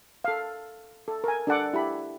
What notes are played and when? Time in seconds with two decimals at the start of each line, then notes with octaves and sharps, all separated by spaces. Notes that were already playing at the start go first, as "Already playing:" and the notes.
0.24 A4 F5
1.08 A4
1.24 A#4 G#5
1.47 D4 A4 F#5 D6
1.73 E4 G4 B5